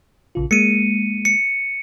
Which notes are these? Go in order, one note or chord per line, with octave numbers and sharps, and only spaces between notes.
A#1 C#3 F4
G#3 A#3 C#7 D#7
C#7